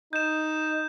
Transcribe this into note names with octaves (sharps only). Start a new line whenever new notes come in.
D#4 G6 E7